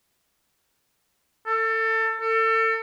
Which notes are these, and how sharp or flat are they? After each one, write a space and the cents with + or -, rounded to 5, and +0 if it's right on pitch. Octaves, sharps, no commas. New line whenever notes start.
A4 +25
A4 +30